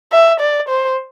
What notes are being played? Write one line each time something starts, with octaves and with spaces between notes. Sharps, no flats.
E5
D5
C5